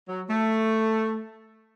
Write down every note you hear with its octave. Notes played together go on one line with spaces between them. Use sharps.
F#3
A3